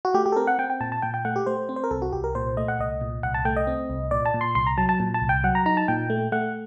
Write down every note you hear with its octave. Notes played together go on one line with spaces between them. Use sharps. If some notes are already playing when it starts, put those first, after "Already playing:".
F#4
A3 G4
G4
A4
C4 A#4
F#5
C4 G5
G5
A#2 A5
A5
A#2 G5
G5
A3 F#5
G4
A3 C5
C4
C5
A#4
C2 A4
F#4
C2 G4
A#4
A#2 C5
A3 D#5
F#5
C2 D#5
A#2
C2 F#5
A5
A3 G5
D#5
C4
C2
A#2 D5
A5
A#2
C6
C2 C6
A#5
F#3 A5
A5
A#2
A5
C2
G5
F#3 F#5
A#5
D#4 A#5
A5
A#2 G5
A3
A3 F#5